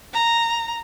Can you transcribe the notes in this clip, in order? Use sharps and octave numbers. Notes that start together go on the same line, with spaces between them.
A#5